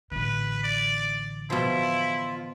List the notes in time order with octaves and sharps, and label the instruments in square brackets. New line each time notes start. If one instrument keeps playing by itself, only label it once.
[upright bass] A1 D3 [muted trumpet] B4
[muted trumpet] D5
[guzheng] B2 F3 [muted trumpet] E4 [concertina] F4